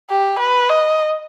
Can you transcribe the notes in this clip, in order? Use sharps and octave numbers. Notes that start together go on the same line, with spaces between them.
G4
B4
D#5